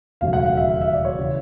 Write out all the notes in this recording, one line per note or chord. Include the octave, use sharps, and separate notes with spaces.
E1 D#2 C#3 F#3 A3 F5
F#5
F5
E5
F5
E5
D5
C#5
C#3 E3